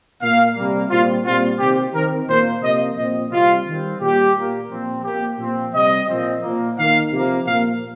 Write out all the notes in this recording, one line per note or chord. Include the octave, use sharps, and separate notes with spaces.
A#2 A#3 F5
C3 G3 A#3
A#2 G3 C4 F4
A#2 G3 C4 F4
C3 D#3 C4 G4
D#3 C4 A#4
A#2 A#3 C5
C3 F3 A#3 D#5
A#2 F3 C4 D#5
C3 G3 C4 F4
D#3 G3 C4
A#2 G3 A#3 G4
A#2 A#3
A#2 F3 C4
A#2 A#3 G4
A#2 F3 C4
C3 G3 C4 D#5
A#2 F3 C4
A#2 F3 A#3
D#3 A#3 F5
C3 F3 A#3
A#2 F3 A#3 F5